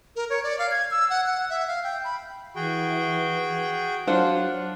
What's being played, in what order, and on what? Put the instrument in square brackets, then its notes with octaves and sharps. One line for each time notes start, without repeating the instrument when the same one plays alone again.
[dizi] A#4
C#5
D5
F5
G#6
E6
F#5
F#5
E5
F5
G5
B5
[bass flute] E3 [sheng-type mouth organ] F#4 G#4 G5
[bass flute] F#3 [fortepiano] D4 F4 F#5 [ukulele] C5